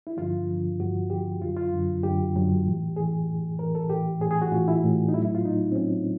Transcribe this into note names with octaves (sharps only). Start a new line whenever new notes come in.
E4
G2 D3 F3 F4
G2 D3 F3
G2 D3 F3 F#4
G2 D3 F3 G4
F#2 D3 F#3 F4
F4
F#2 D3 F#3
F#2 D3 F#3 G4
F#2 D3 F#3
A2 E3
A2 E3 G#4
A2 E3
A2 E3 A#4
A4
A2 E3 G4
A2 E3 G#4
G#4
F#4
A2 E3 F4
E4
A2 E3
D#4
A2 F#3 E4
E4
F4
A2 F#3 D#4
C4
A2 F#3 C#4